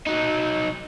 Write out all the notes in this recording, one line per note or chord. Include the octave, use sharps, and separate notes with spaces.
F#3 D#4